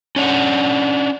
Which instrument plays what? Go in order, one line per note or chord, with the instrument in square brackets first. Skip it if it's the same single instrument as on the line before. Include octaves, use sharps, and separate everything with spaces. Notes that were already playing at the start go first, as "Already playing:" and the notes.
[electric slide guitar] C#4 D4 E5 F#5